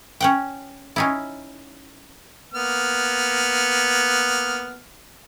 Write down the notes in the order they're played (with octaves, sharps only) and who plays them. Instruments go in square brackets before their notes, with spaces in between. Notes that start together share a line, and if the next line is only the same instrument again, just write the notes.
[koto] C#4 F#5 G5
C#4 D#4 E4
[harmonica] A#3 B3 F6